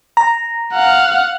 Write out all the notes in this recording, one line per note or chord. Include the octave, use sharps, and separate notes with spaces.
A#5
F5 F#5